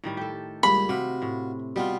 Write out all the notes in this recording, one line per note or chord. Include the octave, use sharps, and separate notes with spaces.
A2 D#3 G3
G4 A4
C#2 G3 A#3 B5
C3 F#4 F5
A2
B2 G3 B3 F4